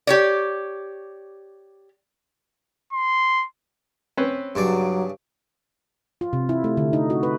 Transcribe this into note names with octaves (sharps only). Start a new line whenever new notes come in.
G4 C#5 D5
C6
C4 C#4 B4
G2 C#3 F#3 D5
F4
C3
E4
A3
D3
D#4
F#4
B4